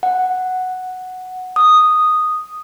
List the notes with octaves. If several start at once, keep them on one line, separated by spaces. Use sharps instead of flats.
F#5
D#6